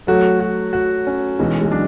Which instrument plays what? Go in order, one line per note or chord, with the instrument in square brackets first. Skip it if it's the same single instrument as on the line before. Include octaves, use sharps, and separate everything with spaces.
[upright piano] F#3 A3 [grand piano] F#4
[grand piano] F#4
F#4
C#4
[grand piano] B1 [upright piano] E3 G#3
[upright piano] G#3
[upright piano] F#3 [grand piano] D4